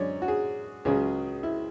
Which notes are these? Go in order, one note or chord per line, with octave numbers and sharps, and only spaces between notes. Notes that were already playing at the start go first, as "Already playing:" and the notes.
Already playing: F#2 D3 G#3 C#5 D5
F#4
G#4
C#2 C#3 F#3 G#4
E4